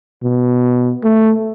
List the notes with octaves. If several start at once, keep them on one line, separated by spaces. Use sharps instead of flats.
B2
A3